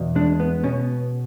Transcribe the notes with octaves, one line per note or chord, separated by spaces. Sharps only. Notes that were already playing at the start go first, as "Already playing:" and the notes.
Already playing: E2 B2
G#3 D4
B3
B2 C#4